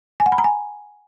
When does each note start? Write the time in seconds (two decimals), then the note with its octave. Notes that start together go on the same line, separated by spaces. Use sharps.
0.20 G#5
0.26 F#5
0.32 B5
0.38 A#5
0.44 G#5